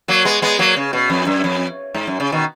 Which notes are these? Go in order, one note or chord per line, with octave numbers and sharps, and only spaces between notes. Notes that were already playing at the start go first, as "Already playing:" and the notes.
F#3 A#3
G#3 B3
G#3 B3
F#3 A#3
C#3
B2
F2
F#2
F2
G#2
F#2
C#3
B2 D#3